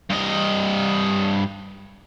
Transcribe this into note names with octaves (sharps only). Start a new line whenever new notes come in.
G2 D#5